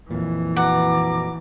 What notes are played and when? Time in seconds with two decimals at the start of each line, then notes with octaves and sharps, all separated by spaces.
0.11 F2 A#2 E3
0.56 B2 F#5 A#5 D6